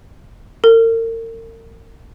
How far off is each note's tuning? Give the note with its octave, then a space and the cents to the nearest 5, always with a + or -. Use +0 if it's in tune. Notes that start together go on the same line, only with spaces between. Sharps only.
A#4 -40